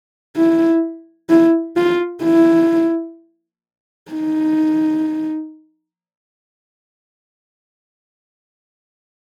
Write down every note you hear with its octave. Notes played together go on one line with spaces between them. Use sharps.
E4
E4
F4
E4
D#4